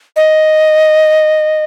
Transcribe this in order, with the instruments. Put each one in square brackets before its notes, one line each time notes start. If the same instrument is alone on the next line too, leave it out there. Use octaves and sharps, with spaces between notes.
[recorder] D#5